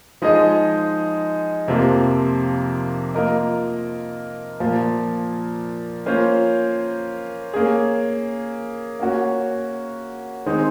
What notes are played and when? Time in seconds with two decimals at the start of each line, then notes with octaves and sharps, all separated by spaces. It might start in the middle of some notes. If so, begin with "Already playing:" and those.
0.22 F3 G#3 D#4 G#4 D#5
1.68 F2 C3 F3 A#3
3.14 A#3 F4 A#4 D#5
4.60 A#2 F3 A#3
6.06 A#3 C#4 F4 C5
7.54 A#3 C#4 G#4
8.99 A#3 C#4 F#4
10.46 D#3 G#3 C4 D#4